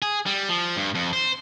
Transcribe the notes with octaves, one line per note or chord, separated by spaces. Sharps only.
G#4
G3
F3
G2
F2
C5